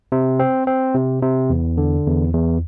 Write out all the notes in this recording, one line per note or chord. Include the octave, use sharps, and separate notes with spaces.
C3
C4
C4
C3
C3
E2
D3
E2
E2